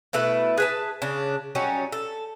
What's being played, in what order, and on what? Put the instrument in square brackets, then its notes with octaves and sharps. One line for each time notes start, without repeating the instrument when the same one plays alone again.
[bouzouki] B2 A3 E4 B4
G#4 B4 A5
C#3 D4
F#3 G3 C#4 D#4
A4